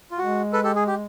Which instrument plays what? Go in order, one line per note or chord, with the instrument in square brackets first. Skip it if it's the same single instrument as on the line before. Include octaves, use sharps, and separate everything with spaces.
[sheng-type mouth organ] F4
[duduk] G#3 [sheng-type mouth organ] F#4
[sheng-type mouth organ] A4 B4
G4 A4
G#4
G4